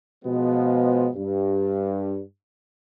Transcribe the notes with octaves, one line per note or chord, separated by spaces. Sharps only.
B2 F3 G#3 B3
G2